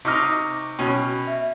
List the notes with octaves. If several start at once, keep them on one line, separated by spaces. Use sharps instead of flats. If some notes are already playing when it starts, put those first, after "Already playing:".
C3 D#4 C#6 D6 F6 A#6
B2 C#4 G5 B5
E5